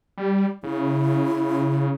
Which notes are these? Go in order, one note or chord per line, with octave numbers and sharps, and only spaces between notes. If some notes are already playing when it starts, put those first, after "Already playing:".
G3
C#3 E4